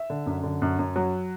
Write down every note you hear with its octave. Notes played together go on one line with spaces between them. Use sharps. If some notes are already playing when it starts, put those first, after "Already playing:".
Already playing: E5
D3
F#2
D3
F#2
F#2
F#3